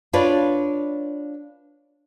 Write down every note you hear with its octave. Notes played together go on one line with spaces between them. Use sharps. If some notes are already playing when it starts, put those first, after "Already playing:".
D4 F4 B4 C#5 D5